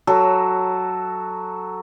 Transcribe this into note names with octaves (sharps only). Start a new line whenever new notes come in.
F#3 A4